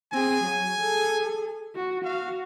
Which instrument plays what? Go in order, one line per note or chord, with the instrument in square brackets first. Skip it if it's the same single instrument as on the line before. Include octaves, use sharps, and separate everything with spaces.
[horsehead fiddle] C4 G#4 [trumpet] G#5
[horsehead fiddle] F#3
G#4 A4
F#4
[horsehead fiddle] F#4 [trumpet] F5